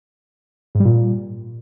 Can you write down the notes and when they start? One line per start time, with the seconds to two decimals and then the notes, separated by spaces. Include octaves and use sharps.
0.75 G#2
0.80 G3
0.85 A#2